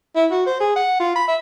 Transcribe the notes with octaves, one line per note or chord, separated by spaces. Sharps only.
E4
F#4
C5
G#4
F#5
F4
B5
E5